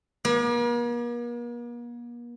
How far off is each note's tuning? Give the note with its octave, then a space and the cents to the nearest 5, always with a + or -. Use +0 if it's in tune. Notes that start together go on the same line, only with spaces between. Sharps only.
A#3 +45